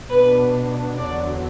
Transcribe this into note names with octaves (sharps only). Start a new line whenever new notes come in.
B2 B3 D4 B4
E2 D3 F#3 D4 D5